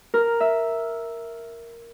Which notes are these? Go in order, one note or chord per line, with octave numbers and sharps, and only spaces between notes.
A#4
E5